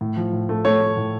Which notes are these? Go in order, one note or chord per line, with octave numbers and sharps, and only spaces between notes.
A2
F3
A2
A3
A3 C#5
A3
A2